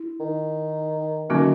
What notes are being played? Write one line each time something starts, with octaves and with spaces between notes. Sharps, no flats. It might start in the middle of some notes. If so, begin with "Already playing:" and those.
Already playing: E4
D#3
D3 D#3 F#3 A#3 C#4 F#4